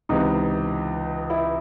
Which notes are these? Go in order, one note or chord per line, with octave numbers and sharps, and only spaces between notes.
C#2 C3 E3 D#4
E4